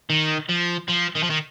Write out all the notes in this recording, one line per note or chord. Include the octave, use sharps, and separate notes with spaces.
D#3
F3
F3
D#3
F3
D#3